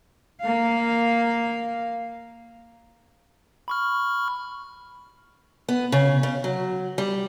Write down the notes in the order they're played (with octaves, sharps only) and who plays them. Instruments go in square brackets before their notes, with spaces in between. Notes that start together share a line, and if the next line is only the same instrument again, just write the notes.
[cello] A#3 F5
[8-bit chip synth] B5 C#6 F6
[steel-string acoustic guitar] B3
C#3
C#3
F#3
G3